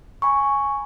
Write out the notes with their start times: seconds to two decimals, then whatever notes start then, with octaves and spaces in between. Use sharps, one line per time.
0.22 G#5 B5 C#6